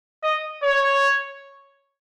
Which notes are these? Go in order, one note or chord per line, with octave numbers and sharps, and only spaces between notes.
D#5
C#5